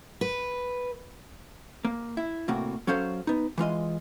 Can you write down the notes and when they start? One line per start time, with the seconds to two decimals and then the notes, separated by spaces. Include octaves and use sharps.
0.21 B4
1.85 A#3
2.17 E4
2.48 A2 C3 A#3 F#4
2.87 F#3 C#4 A4 C5 F5
3.27 B3 D#4
3.58 E3 G#3 F4 D#5